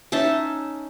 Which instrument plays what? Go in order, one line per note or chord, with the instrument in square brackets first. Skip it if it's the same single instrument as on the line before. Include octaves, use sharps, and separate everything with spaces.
[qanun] C#4 D#4 E5 A5